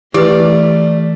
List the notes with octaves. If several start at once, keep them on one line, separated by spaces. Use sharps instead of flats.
E3 A3 G4 B4 D5